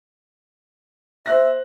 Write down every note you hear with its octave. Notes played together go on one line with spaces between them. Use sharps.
C5 E5 F#6 A#6